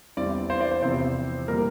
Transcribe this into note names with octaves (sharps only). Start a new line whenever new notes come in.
E2 E3 G3 C4 D5
C5
D5
C5
E2 C3 F3 C4 C5
A#2 G3 A#4